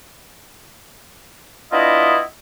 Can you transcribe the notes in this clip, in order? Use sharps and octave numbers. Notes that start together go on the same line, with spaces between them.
B3 D4 E4 F4 D#5